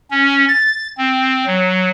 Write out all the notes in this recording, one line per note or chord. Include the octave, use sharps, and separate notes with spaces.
C#4
A6
C4
F#3